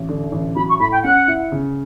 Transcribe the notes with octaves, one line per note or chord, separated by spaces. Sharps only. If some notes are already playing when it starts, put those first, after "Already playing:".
Already playing: A1
D3
A1
F#3 B5
C#6
A2 B5
G5
C#4 F#5
E4
C#3